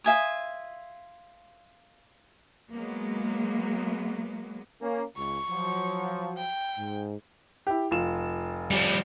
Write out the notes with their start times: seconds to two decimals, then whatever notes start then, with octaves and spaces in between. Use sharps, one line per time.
0.04 F4 E5 G#5 D#6
2.74 F#3 G#3 A#3 B3
4.81 A#3 C#4
5.17 C#2 C#6
5.50 F3 F#3
6.37 G5
6.77 G#2
7.67 E4 G4
7.91 F1 F4 E7
8.71 F3 G3